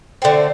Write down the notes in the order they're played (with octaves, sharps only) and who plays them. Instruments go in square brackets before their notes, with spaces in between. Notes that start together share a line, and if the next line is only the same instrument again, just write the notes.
[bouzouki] D3 A3 C4